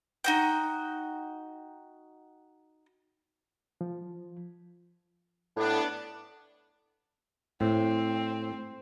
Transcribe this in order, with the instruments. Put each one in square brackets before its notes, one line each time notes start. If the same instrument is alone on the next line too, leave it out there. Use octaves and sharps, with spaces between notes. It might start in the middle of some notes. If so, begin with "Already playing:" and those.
[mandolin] D#4 F#4 G5
[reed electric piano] F3
[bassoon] A2 [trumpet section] B3 D4
[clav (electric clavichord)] A2 [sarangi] C4